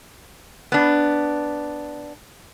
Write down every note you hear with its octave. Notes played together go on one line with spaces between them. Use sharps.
B3 D4